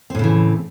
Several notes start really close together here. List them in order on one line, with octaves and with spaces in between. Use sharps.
C4 A2 C#3 E3